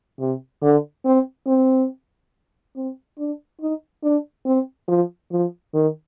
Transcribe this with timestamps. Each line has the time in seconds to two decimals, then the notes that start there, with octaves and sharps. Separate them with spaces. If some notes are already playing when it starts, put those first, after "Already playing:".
0.20 C3
0.62 D3
1.05 C4
1.47 C4
2.76 C4
3.18 D4
3.61 D#4
4.03 D4
4.45 C4
4.88 F3
5.31 F3
5.74 D#3